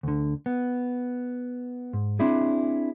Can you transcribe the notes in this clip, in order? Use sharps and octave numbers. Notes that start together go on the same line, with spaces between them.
D2 D3
B3
G#2
C4 D4 E4 G#4